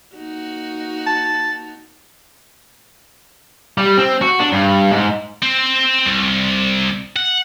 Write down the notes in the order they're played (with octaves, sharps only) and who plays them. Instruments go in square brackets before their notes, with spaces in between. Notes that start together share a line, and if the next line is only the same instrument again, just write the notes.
[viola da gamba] A#3 D#4 F#4
[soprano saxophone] A5
[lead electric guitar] G3
C4
F#4
D4
G2
G#2
[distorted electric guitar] C4
C2
F#5